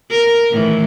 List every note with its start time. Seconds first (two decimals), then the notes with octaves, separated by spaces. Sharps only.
0.10 A#4
0.51 A2 D#3 E3